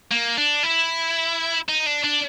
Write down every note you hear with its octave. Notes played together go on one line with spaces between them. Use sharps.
A#3
D4
E4
D#4
D4
D4